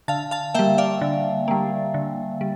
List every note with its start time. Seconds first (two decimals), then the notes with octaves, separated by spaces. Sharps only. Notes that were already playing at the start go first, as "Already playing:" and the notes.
0.08 D3 F5 A5
0.31 F5 A5
0.54 G3 A#3 E5 G5
0.78 D5 F5
1.01 D3
1.48 G3 A#3
1.94 D3
2.41 G3